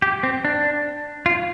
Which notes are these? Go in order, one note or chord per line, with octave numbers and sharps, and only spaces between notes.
G4
C4
D4
F4